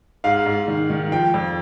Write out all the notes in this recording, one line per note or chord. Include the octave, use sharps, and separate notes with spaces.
G#2 F5
G#2
D#3
D#3
F3 G5
F2